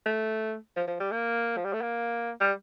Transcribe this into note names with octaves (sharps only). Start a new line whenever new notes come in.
A3
F3
F3
G3
A#3
F3
G3
A3
A#3
G3